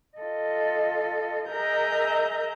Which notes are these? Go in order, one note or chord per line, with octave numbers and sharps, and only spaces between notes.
F4 A4 D#5
G#4 A#4 D#5 E5 A#5 G6